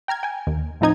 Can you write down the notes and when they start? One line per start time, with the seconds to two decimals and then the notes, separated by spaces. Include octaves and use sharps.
0.08 G5 A#5 F6 G#6
0.23 G5 G#5
0.47 D#2
0.81 A2 F3 C4 D#4 D#5 G#6